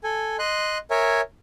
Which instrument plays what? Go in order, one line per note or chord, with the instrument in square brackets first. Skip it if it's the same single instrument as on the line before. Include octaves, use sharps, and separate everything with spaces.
[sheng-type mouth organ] A4 G#5
D#5 C6 F#6
A#4 C#5 E5 G#5